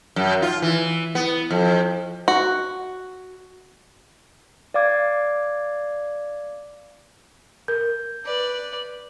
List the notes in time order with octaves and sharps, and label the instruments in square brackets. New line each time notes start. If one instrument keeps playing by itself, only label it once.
[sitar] F#2
F4
E3
B3
F2
[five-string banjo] F#4
[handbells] D5 F5 D6 G#6
[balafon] A#4 [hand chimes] G6
[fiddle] B4 D5